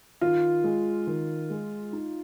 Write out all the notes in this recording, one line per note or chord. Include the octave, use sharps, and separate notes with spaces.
D#3 F4
G#3
D#3
G#3
D#4